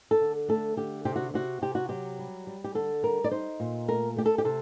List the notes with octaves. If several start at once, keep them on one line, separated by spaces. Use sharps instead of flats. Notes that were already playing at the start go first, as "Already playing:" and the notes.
A4
D3
A3 A4
D3 G4
C3 G4
F#4
C3 F#4
C3 G4
F#4
F#3 G4
G3
G3
G4
D3 A4
G3 A#4
D5
D#4 C5
A#2
A3 A#4
A3 G4
A4
G4
C3 A4